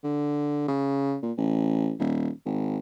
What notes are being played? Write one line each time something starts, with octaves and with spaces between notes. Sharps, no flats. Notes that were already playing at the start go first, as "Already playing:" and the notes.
D3
C#3
A#2
A1
D#1
G#1